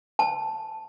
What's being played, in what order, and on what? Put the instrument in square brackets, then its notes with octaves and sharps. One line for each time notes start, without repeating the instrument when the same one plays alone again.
[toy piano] A5